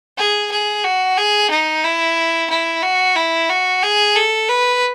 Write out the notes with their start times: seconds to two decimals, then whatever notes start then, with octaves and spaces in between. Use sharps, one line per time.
0.18 G#4
0.51 G#4
0.84 F#4
1.17 G#4
1.50 D#4
1.84 E4
2.50 E4
2.83 F#4
3.16 E4
3.49 F#4
3.83 G#4
4.16 A4
4.49 B4